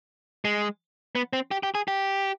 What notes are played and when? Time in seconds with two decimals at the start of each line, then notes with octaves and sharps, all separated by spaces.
0.45 G#3
1.15 B3
1.33 C4
1.51 G4
1.63 G4
1.75 G#4
1.88 G4